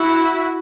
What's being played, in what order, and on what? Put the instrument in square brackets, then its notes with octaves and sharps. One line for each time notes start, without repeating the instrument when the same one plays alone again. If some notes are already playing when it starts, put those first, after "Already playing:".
Already playing: [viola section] E4 F#4